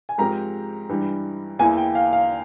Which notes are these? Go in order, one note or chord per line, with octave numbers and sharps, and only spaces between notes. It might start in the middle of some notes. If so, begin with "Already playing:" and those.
G#5
G#2 F3 C4 G4 A#4 A#5
G2 E3 G3
E2 E3 A#3 E4 G#5
G5
F5
F5